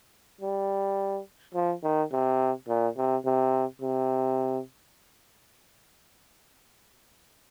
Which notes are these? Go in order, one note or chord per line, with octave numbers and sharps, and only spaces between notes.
G3
F3
D#3
C3
A#2
C3
C3
C3